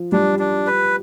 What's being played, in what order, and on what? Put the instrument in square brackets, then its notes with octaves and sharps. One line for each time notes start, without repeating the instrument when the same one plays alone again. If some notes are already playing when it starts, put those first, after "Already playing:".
Already playing: [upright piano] F3
[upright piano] G3 [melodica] D4
[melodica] D4
B4